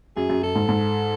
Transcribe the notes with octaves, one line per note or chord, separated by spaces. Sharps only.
F#2 G#4
F#2
F#2 A4
G#2
G#2